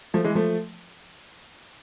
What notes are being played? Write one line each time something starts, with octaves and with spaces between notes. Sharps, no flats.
F3 A3
E3 G#3
F3 A3